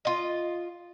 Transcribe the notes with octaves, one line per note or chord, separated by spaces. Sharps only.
F4 D#5